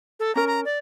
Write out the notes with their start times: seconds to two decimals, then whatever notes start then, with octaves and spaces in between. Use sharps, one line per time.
0.20 A4
0.35 C#4 A#4 A#5
0.47 A#5
0.65 D5